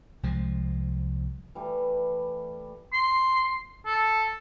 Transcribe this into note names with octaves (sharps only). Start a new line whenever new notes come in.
C2 F3 G#3
E3 G3 A3
C6
A4